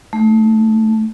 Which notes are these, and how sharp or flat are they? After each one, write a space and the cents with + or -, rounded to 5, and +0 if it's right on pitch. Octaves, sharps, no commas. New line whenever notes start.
A3 +0 D#4 +0